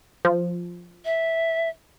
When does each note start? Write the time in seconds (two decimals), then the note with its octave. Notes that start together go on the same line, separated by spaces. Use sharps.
0.25 F3
1.05 E5